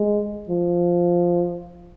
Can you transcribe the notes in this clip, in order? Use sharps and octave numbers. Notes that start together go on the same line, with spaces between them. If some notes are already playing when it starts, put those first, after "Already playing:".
Already playing: G#3
F3